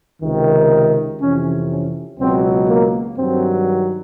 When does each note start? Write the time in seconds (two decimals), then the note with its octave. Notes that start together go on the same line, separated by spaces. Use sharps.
0.22 C#2 C3 D#3
1.21 F2 C3 E3 C#4
1.69 C#4
2.19 C#2 B2 F#3 C4
2.67 A#3
3.16 G2 D#3 F#3 C4